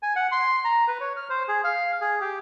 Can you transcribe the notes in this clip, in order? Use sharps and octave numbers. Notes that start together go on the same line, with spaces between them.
G#5
F#5
C6
A#5
B4
C#5
F6
C5
G#4
F5
G#4
G4